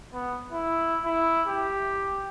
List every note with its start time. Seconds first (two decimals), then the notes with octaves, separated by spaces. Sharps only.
0.14 B3
0.52 E4
1.04 E4
1.48 G4